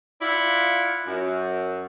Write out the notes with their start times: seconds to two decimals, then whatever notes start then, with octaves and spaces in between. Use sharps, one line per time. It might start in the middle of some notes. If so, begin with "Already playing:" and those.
0.22 E4 F4 D5 F5 F#5
1.07 F#2